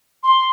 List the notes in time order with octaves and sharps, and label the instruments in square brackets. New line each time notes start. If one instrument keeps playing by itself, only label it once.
[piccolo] C6